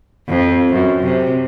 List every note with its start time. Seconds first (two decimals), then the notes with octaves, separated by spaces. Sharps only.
0.28 F2
0.73 F#2
1.03 C3